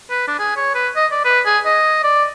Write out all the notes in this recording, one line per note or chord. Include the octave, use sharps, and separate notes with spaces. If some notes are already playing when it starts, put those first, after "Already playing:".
B4
D4
G#4
C#5
B4
D#5
D5
B4
G#4
D#5
D5